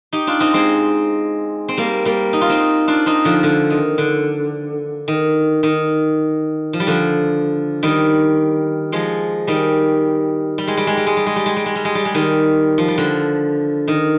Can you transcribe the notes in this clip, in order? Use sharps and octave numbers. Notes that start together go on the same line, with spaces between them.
D#4 G4
D4 F4
C4 D#4
G#3 C4
C4
G3 A#3
G3 A#3
D#4
F4
C4 D#4
D4 F4
C4 D#4
D3 F3
D3
D#3
D3
D#3
D#3
F3
G3
D3 F3
D#3 G3
F3 G#3
D#3 G3
G3
G#3
G3
G#3
G3
G#3
G3
G#3
G3
G#3
G3
G#3
G3
G#3
G3
G#3
D#3 G3
F3
G3
D3 F3
D#3